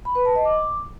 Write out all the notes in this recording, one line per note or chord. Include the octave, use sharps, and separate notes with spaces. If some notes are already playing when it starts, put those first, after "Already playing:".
B5
B4
A5
D#5
D6